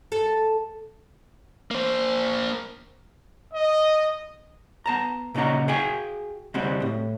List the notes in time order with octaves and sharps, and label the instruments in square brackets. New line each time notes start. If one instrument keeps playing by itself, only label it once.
[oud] A4
[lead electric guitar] A#3 C5
[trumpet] D#5
[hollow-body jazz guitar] B3 A5 A#5
A#2 C#3 D#4 F#4 A#5
F#4 G#4 F5 G5 G#5
C#2 G3 G#3 C4 F#4
A2